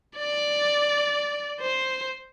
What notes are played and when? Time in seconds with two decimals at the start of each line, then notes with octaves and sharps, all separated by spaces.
0.17 D5
1.61 C5